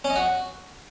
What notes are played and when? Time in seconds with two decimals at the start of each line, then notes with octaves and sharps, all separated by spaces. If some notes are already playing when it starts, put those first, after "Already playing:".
0.04 C#4
0.10 D#5
0.16 F#4